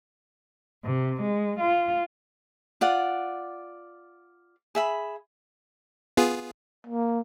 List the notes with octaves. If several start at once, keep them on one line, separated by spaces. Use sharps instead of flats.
C3
G#3
F4
F4 D5 F#5
G#4 E5 B5
B3 F4 G#4
A#3